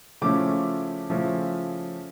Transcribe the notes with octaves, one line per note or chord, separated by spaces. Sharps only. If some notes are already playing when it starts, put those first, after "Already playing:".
C#3 F3 A3 C#4 E4 D6
C#3 F3 A3 C#4 E4